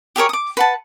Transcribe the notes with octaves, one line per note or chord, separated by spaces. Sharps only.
G4 G#4 A#4 C#5
D6 D#6
B4 F#5 A5